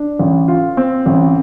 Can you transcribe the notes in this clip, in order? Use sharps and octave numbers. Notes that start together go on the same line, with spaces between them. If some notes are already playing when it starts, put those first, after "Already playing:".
Already playing: D4
A1
F4
C4
A1